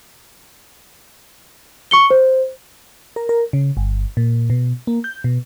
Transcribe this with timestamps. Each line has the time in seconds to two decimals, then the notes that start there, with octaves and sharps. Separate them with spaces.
1.91 C#6 C#7 G7
2.10 C5
3.16 A#4
3.29 A#4
3.53 C#3
3.77 G1
4.17 A#2
4.50 B2
4.87 A#3
5.04 G6
5.24 B2